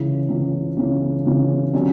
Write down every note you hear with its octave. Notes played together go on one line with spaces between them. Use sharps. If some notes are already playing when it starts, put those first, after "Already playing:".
Already playing: C#2 C#3 E3
C#2 C#3 E3
C#2 C#3 E3
C#2 C#3 E3
D3 F#3 C#4 G4